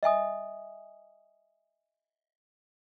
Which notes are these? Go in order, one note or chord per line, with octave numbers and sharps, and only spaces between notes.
D#5 E5 G#5 D#6